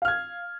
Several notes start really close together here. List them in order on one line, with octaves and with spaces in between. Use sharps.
F5 F6 G#6